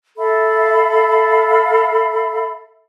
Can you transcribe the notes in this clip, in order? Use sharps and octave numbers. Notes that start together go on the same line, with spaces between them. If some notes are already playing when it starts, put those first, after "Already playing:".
A4 E5 F5 B5